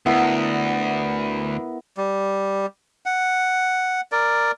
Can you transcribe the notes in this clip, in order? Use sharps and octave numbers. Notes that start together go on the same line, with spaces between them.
D2 B3 E4 A#4
G3
F#5
A#4 D5